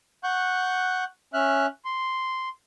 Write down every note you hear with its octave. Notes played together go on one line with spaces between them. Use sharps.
F#5 C#6 F#6 G6
C#4 E5 F6 F#6
C6